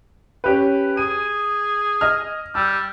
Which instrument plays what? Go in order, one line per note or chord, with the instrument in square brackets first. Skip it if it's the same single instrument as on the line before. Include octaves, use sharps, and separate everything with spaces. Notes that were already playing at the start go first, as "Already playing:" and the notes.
[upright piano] C#4 G4 B4
[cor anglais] G#4 [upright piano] D#7
[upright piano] D#5 F6
[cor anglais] G3 [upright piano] E6